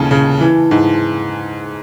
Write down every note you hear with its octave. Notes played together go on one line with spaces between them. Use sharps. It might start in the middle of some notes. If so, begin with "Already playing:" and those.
Already playing: D#2 C#3 G#5 A5
C#3
E3
G#2